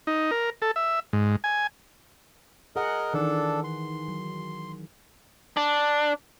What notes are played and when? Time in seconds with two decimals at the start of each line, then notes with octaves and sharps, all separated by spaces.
0.07 D#4
0.31 A#4
0.62 A4
0.76 E5
1.13 G#2
1.44 G#5
2.76 G#4 A#4 D#5 F#5
3.14 D#3 E3 D4 A4
3.64 C6
4.08 F#3
5.57 D4